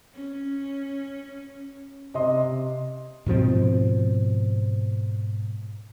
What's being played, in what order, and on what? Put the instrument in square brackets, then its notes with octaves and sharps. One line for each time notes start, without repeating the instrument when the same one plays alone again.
[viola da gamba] C#4
[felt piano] C3 D#5 C6
[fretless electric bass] G#2 B2 F3 C4